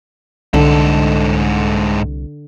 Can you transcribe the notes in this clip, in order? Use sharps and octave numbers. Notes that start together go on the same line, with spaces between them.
C2 G#2 D3 A4